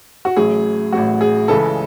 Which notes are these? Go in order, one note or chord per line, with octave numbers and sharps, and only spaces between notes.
F#4
A1 A2 F#3 G#4
A1 A2 F#3 F#4
G#4
C#2 C#3 E3 G#3 A4